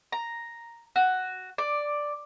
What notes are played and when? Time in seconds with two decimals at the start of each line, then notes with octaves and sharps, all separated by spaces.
0.12 A#5
0.96 F#4
1.58 D5